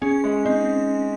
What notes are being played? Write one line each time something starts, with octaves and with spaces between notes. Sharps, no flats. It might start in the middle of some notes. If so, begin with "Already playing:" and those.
C#4 G#4
G#3
C4 D#4